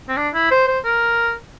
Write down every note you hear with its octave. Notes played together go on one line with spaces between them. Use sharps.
C4
D4
E4
C5
C5
A#4